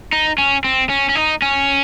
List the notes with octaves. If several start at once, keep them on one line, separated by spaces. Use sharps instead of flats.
D#4
C#4
C4
C#4
C#4
D#4
C#4